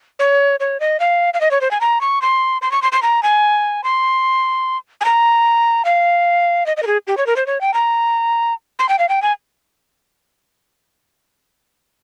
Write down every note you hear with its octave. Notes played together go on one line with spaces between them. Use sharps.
C#5
C#5
D#5
F5
F5
D#5
C#5
C5
G#5
A#5
C#6
C6
C6
C#6
C6
C6
A#5
G#5
C6
G#5
A#5
F5
D#5
D#5
A#4
G#4
G4
C#5
A#4
C5
C#5
G5
A#5
C6
G5
F5
G5
G#5